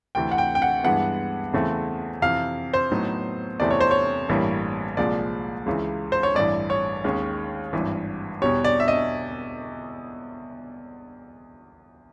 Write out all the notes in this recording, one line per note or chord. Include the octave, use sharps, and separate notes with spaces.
D2 C3 E3 G5
F#5
G5
G5
F#5
G2 E3 G#3 B3 F#5
E2 C#3 E3 A3 C4
F2 C3 E3 F5
C5
A2 F#3 B3 D#4
E2 C3 E3 A3 C4 D5
C#5
C5
C#5
A1 G2 E3 G3 A#3
C2 A#2 F3 G#3 D5
C#2 C#3 E3
C5
C#5
A1 G2 E3 D5
C#5
D#2 D#3 G#3 C#4
G#1 G2 E3
E2 B2 G3 C#5
D5
E5
D#5